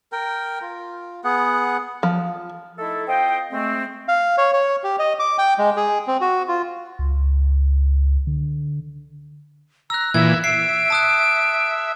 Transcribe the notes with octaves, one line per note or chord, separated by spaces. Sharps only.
A#4 G5
F4
B3 G#4 F#5
F3
A3 D#4 E4 A4
C4 F4 C5 D#5 G5
G#3 A3 C4
F5
C#5
C#5
G4
D#5
D6
G5
G#3
G#4
C4
F#4
F4
C#2
D3
A#5 E6 F#6
A#2 E3 E5 G#6
E5 C7 D7
A5 D#6 F#6